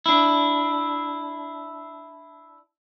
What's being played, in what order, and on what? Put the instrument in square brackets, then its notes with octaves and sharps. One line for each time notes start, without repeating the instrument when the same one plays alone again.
[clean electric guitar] D4 E4